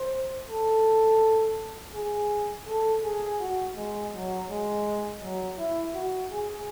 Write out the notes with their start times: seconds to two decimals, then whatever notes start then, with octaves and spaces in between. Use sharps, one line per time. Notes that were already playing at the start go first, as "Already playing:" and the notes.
Already playing: C5
0.49 A4
1.94 G#4
2.67 A4
3.04 G#4
3.40 F#4
3.76 G#3
4.13 F#3
4.49 G#3
5.22 F#3
5.58 E4
5.94 F#4
6.31 G#4